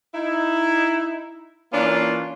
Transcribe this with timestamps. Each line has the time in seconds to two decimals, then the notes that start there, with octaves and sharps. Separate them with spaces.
0.15 D#4 E4
1.72 E3 A#3 C#4 D4 F4